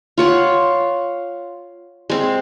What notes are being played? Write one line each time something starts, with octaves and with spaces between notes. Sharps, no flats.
F4 C#5 F#5
G#3 C4